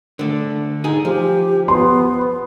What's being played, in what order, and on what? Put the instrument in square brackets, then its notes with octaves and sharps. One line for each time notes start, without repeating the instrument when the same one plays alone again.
[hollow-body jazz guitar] D3 A3
D#4 G#4
[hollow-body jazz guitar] F3 [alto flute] G4
[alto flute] B3 [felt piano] C6